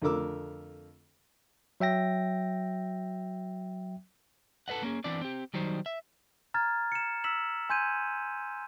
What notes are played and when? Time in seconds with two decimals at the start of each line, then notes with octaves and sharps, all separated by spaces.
0.02 F2 D3 A3 A#4 D6 E6
1.80 F#3 E5 G5 A#6
4.68 A4 B4 D#5 F#5
4.83 A#3 C#4 G#4
5.04 E3 B3 C4 D4 D5
5.21 C4 G4
5.54 D#3 F#3 G3 D#4 C5
5.86 E5
6.54 A#5 F6 G#6 A6
6.92 C#7 E7
7.24 E6 B6 E7 F#7
7.70 G#5 C6 G6 G#6 D#7